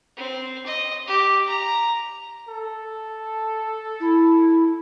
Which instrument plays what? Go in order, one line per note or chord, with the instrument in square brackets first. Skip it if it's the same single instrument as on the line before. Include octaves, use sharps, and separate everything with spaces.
[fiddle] C4
D#5
G4
A#5
[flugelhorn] A4
[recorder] E4